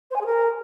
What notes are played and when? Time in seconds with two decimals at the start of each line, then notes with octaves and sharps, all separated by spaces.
0.11 C5
0.16 G#5
0.21 G#4
0.26 A#4